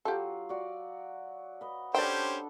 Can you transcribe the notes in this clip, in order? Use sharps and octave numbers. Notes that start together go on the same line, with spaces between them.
F#3 F4 G4 A4
F#4 D5
B4 D#5
C#4 D4 G4 A4 C5 D5 G5